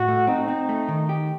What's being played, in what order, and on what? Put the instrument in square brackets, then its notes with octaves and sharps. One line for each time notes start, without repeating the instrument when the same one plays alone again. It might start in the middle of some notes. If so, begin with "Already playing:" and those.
Already playing: [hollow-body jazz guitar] A2 [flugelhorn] F#4
[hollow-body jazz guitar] A3
[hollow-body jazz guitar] C4 [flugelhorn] D#4
[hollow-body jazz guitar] C4
A3
D#3
G4